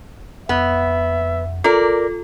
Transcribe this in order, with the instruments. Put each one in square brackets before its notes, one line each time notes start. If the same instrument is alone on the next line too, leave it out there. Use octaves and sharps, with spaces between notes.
[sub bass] F2 [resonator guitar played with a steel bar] B3 [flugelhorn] E5
[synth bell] F4 A4 [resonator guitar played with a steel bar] A#4 D5